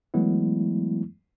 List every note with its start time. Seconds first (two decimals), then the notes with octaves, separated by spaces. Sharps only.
0.14 E3 F#3 G#3 A3 B3 E4